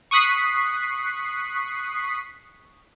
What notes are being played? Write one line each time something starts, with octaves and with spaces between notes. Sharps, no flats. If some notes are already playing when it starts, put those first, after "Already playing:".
C#6 D#6 F#6 B6 C7